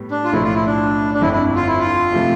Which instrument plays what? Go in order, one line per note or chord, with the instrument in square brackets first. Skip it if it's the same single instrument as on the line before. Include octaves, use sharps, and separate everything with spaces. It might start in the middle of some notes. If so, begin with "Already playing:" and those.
Already playing: [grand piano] A2 G3 B3
[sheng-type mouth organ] D4
F4
[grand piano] B1 A2 F3 A3 [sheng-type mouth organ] E4
[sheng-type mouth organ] F4
E4
D4
D4
[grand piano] G1 F2 D3 [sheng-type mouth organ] E4
[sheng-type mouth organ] E4
F4
E4
F4
[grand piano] C3 F3 A3